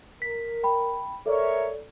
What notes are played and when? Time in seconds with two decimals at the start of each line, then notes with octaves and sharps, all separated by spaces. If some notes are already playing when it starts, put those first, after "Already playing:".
0.22 A#4 B6
0.63 G5 B5
1.26 A4 A#4 C#5 D5 E5